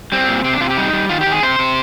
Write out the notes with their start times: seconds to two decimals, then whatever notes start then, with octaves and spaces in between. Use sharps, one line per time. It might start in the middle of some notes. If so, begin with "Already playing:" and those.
0.12 G3 C4
0.28 A#2
0.44 C3 C4
0.53 D4
0.60 C3 F4
0.70 G4
0.77 G3 D#4
0.93 G3
1.09 D#3 F4
1.21 G4
1.27 D#3 G#4
1.43 C3 C5
1.59 C3